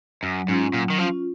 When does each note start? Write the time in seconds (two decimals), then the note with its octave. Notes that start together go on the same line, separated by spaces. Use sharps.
0.23 F#2 F#3
0.48 G#2 C#4 F4
0.73 A#2 F#3
0.90 D#3
0.98 F3 C#4 F4